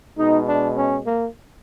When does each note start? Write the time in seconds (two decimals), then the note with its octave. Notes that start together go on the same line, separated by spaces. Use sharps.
0.17 B2 G#3 D#4
0.47 D4
0.76 C#4
1.06 A#3